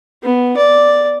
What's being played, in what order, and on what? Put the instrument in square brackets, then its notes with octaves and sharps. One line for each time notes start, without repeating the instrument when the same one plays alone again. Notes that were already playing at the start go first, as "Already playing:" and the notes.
[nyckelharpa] B3
D5